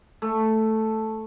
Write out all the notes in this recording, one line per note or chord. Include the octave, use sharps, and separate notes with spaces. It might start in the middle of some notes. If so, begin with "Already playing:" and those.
A3